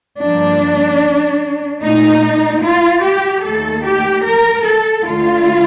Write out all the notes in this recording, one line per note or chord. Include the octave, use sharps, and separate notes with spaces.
G2 F3 A#3 D4
A#2 A3 D#4
F4
G4
D#2 D#3 A3 A4
G4
A#4
A4
D2 D3 A3 F4